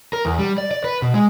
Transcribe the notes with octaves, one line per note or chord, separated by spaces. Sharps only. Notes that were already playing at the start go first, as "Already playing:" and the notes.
A#4
E2
G3
D5
D5
B4
B2
G#3